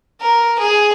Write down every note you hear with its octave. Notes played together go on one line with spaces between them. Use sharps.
A#4
G#4